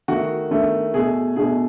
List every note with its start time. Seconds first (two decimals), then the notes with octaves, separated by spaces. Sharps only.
0.08 D#3 A3 F#4
0.51 D#3 A3
0.93 B2 A3 G#4
1.36 B2 A3 G#4